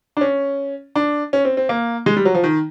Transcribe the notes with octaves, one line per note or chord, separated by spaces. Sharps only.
D4
C#4
D4
C#4
C4
C4
A#3
G#3
G3
F#3
F3
D#3